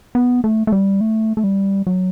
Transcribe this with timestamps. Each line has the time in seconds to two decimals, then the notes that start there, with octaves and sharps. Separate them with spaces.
0.15 B3
0.44 A3
0.67 A3
0.72 G3
1.01 A3
1.37 A3
1.44 G3
1.87 F#3